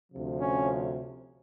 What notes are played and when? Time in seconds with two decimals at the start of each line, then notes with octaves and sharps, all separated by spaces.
0.12 D2 C3 F3
0.40 C#4